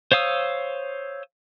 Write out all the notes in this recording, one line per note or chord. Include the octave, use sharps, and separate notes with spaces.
C5 C#5 F5 D#6 E6